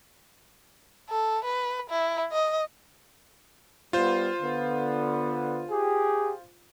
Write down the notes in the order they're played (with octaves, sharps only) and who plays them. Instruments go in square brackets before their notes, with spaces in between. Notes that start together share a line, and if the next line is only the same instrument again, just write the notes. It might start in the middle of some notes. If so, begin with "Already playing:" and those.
[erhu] A4
B4
E4
D#5
[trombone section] G3 B3 [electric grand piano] F4 C5
[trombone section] D3 B3
G4 G#4